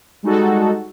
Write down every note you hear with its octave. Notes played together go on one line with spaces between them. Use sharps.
G3 G#3 D#4 F#4 A4